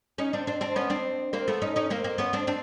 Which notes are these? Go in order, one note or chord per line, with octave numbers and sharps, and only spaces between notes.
C#4 D#4
C4 D4
C4 D4
C4 D4
B3 C#4
C4 D4
A#3 C4
A3 B3
C#4 D#4
C#4 D#4
A#3 C4
A#3 C4
B3 C#4
C4 D4
C4 D4